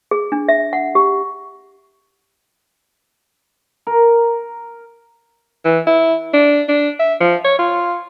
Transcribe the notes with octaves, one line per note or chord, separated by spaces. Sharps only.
G#4
D4
E5
F#5
G4
A#4
E3
E4
D4
D4
E5
F3
C#5
F4